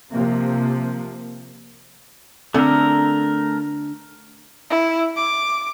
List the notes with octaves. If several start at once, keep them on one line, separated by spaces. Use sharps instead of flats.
C3 F3 A#3
D3 A3 C4 A#4
E4
D6